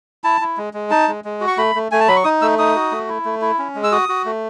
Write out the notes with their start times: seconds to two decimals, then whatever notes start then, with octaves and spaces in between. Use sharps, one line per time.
0.24 E4 A5
0.41 E4
0.57 G#3
0.74 G#3
0.90 D#4 A5
1.08 G#3
1.24 G#3
1.41 F#4
1.48 C#6
1.57 A3 B5
1.75 A3
1.91 A3 G#5
2.00 A5
2.08 F#3 B5
2.16 C#6
2.24 D#4 D#6
2.42 A3 E6
2.59 D#4 D#6
2.75 F#4
2.91 A3
3.08 E4
3.25 A3
3.41 E4
3.59 C#4
3.75 G#3
3.84 E6
3.92 F#4 D#6
4.09 F#4
4.25 A3